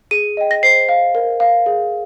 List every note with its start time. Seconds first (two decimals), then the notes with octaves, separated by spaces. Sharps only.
0.11 G#4 D#7
0.37 D#5 G5
0.51 A#6
0.63 C5 C7
0.89 F5
1.15 A#4
1.40 F5
1.66 G#4